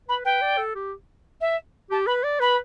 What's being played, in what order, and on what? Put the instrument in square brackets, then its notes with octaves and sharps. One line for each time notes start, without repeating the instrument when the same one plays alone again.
[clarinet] B4 [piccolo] B5
[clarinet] B4 [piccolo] G5
[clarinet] D5
A4
G4
[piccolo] E5
[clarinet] G4 [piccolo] A5
[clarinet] B4 [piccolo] B5
[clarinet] D5
[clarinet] B4 [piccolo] B5